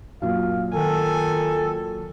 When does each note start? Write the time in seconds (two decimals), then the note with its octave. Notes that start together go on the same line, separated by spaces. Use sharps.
0.22 F#2 A#2 F5
0.74 D#3 A4 G#5